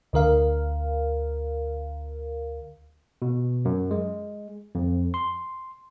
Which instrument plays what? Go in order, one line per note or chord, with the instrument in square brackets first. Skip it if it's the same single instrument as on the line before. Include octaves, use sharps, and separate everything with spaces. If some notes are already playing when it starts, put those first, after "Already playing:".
[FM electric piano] D2 D3 A#4 F5
[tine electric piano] B2
F#2
G#3
F2
C6